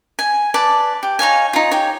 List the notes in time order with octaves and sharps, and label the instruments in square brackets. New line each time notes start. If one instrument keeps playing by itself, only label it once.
[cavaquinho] G#5
B4 D5 A5
G4
D#4 C#5 F5 G#5
D#4 F4
G4 C#5